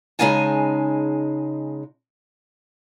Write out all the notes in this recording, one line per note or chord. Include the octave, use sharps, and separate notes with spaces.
C#3 G#3 D#4 F5 G#5 A5